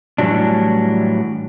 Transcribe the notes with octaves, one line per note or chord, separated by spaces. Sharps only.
A2 E3 F#3 G3 D4